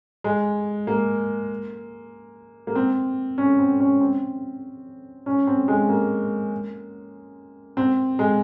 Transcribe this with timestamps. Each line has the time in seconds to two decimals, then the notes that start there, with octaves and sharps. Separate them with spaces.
0.24 G#3
0.87 A#3
2.67 A#3
2.75 C4
3.38 C#4
3.59 C4
3.80 C#4
4.01 C4
5.26 C#4
5.47 C4
5.68 G#3
5.89 A#3
7.77 C4
8.19 G#3